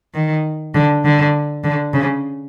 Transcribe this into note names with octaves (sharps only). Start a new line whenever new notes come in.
D#3
D3
D3
D3
C#3